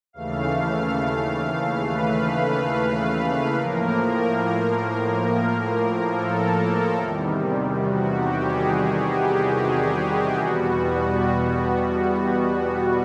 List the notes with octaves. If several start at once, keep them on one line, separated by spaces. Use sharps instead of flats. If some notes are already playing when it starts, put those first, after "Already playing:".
D#2 C#3 E3 A3 F5
B4
A2 F3 A#3 A#4
A4
E2 C3 D#3 G3
F#4
G4
G#4
G4
G4
G#4
G4
E2 B2 G3 B3 F#4